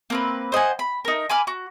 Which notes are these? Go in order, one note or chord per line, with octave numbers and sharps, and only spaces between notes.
A#3 C4 B4
C5 D#5 F#5 G#5
B5
D#4 A#4
G#5 B5 D6 F6
F#4